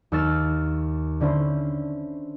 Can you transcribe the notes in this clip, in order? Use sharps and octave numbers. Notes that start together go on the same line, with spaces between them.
D#2 C#6 E6 F6 A6 E7
D3 C#4 E4 C5